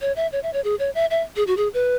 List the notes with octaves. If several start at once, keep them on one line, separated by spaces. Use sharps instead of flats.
C#5
E5
C#5
E5
C#5
G#4
C#5
E5
E5
G#4
F#4
G#4
B4